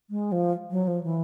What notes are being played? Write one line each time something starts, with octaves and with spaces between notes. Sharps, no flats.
G#3
F3
F#3
F3
E3